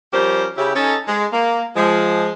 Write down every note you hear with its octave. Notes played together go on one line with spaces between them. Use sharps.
F3 G3 C#4 G4 A#4 C5
C#3 E4 G4
C#4 D#4 A4
G#3
A#3
F3 G#3